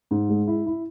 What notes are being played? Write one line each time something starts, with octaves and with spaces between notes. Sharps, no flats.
G#2
G#3
E4
E4